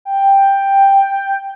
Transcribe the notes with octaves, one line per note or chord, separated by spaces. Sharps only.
G5